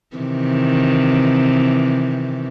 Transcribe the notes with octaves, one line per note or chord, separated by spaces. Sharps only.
C3 D#3 E3